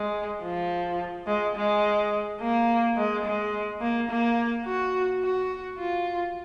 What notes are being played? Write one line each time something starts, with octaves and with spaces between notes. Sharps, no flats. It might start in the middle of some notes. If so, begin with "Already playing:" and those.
Already playing: G#3
F3
G#3
G#3
A#3
G#3
G#3
A#3
A#3
F#4
F#4
F4